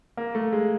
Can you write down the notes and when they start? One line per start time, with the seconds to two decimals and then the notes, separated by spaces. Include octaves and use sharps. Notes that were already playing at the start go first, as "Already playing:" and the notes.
0.17 A#3
0.35 A3
0.53 G#3